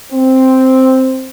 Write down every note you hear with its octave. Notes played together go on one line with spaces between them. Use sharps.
C4